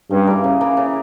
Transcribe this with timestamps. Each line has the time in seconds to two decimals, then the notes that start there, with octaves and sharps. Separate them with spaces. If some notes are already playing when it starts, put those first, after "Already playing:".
0.11 G2 C#3
0.27 E3 A#3
0.44 C#3
0.61 E3 A#3
0.77 C#3